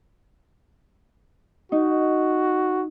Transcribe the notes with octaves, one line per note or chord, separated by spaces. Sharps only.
D#4 F#4